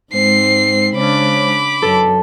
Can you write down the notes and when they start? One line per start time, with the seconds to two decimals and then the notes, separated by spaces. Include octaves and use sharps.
0.13 G#2 G#3 C4 C5 C7
0.96 C#3 C#4 D4 B5 D6
1.82 F#2 A4